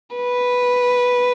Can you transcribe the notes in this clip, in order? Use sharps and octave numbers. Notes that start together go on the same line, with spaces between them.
B4